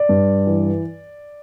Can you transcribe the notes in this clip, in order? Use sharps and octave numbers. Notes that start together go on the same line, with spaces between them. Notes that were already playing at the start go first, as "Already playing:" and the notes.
Already playing: D5
G2
E3